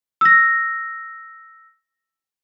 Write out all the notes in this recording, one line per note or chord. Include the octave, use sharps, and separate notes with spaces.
E6 A#6